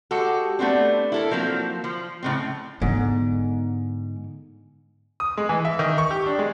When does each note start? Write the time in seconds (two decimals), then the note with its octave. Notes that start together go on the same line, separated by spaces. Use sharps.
0.11 G#3 F#4 G4 A4
0.59 A3 B3 C4 D4
1.12 E4 A4 A#4
1.31 F3 F#3 A#3 C4
1.84 F3
2.23 A2 C#3 C4
2.82 G#2 D3 B3
5.20 D#6
5.38 G#3
5.49 E3
5.65 E5
5.79 D#3
5.98 C#6
6.11 G4
6.26 D4
6.39 G#3